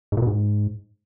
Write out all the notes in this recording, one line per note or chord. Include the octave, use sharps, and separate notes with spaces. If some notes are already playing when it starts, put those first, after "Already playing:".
G#2
A#2
B2
G#2